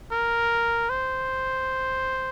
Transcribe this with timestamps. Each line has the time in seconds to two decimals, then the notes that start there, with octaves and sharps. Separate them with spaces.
0.12 A#4
0.90 C5